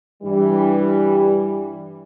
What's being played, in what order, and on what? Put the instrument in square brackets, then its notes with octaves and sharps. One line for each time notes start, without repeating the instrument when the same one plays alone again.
[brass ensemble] G2 E3 G3